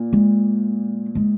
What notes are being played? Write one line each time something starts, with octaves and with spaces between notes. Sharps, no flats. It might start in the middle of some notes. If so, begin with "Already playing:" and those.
Already playing: A#2
G#3
G#3